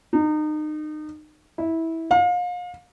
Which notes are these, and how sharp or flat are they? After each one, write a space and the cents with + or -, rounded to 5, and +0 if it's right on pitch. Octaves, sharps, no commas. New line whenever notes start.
D#4 -30
E4 -15
F5 +35